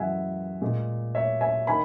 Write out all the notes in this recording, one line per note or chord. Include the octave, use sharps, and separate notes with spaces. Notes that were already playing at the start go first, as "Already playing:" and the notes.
Already playing: F#2 E3 G#3 E5 F#5 G#5
A#2 G#3
C#5 E5
E5 G#5
D#3 G#5 B5